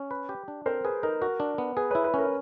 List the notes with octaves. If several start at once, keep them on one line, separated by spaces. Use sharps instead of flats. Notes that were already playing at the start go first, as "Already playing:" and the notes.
Already playing: C#4
B4
G4
D4
C4 A#4 C5
G#4 B4
D#4 A#4
F#4 A#4
D4
B3
G#4 B4
E4 B4 C#5
B4
C#4 A#4